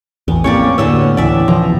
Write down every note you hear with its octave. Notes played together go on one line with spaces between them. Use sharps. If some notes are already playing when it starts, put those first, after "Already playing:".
A1 E2 B3
F2 A2 A#3 C#4 G4 C#5 D5
D2 A2 D3 B3 C#4 E6
D2 A2 C#3 E3 D5 E5
B2 E3 F3 A#5